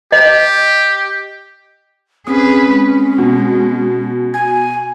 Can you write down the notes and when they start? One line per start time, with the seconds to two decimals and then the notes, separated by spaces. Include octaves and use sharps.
0.12 G4 D#5
2.27 C4 C#4 G#4 B4 D#6
2.70 G#3
3.18 B2
4.34 G#5 G#6